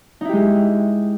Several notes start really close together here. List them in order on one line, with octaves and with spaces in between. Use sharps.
D#4 E4 G4 G#3